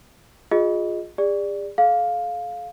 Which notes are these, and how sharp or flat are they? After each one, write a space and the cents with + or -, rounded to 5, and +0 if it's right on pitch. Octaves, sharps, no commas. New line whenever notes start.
F4 +25 G#4 +0 D#5 +0
G#4 -45 D5 +0
A4 -40 F5 +10